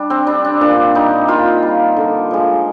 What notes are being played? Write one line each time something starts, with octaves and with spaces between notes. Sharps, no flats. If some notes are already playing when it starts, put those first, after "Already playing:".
Already playing: G3 D4
C4
G3 D4
D4
A#2 D4
G3 D#4
A#2 F4
G3
D3
F3 G#3